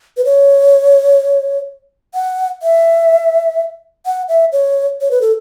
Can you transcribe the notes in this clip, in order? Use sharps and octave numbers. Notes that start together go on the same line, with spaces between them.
B4
C#5
F#5
E5
F#5
E5
C#5
C#5
B4
A4